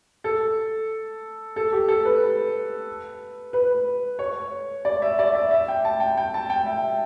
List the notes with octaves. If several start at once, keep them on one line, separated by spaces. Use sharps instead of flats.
A4
A4
G4
A4
B4
B4
C#5
D5
E5
D5
E5
E5
G5
A5
G5
G5
A5
G5
E5